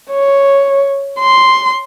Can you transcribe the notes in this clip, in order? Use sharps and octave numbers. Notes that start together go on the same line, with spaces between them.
C#5
C6